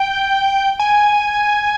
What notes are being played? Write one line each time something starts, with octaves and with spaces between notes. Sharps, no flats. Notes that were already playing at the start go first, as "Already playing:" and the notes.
Already playing: G5
G#5